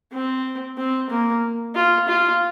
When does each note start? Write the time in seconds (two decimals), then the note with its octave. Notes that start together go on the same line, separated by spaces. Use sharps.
0.12 C4
0.78 C4
1.10 A#3
1.75 F4
2.08 F4